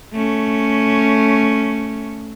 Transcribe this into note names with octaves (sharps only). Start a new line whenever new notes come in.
A3 C#4